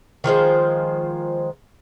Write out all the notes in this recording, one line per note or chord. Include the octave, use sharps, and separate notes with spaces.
D#3 F3 G#3 C5